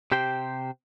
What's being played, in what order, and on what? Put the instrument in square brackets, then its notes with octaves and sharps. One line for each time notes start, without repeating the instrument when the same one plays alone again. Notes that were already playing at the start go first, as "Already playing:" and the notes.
[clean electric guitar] C3 G4 C5 G5